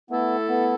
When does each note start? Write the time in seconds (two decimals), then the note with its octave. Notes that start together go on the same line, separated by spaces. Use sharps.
0.10 A3 B3 E4 A4
0.49 B3